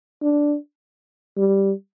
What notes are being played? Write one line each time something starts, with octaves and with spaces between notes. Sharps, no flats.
D4
G3